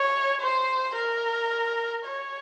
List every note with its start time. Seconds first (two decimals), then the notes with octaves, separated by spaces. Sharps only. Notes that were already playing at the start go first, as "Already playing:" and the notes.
Already playing: C#5
0.41 C5
0.96 A#4
2.05 C#5